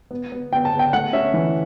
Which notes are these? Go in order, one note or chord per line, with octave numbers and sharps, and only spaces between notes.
B3
B3
B3 G5
A5
B3
G5
A3 F#5
C#4 E5
E3